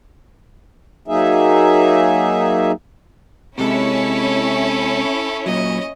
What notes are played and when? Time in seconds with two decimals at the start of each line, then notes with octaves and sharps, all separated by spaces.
1.08 F#3 A#3 D#4 G#4 E5
3.58 C3 G#3 C#4 E4 A4 C#5
5.46 A#2 F#3 D#5